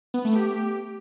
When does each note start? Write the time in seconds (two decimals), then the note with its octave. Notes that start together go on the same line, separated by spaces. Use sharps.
0.14 B3
0.25 A3
0.35 G4